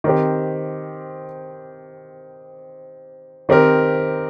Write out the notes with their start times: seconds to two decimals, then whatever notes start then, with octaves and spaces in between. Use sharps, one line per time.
0.04 D#3 C4 G4
3.49 D#3 C4 G4 A#4